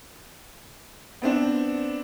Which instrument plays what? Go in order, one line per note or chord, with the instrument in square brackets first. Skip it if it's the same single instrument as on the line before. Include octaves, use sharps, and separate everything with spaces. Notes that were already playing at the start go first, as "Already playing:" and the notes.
[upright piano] B3 C4 D4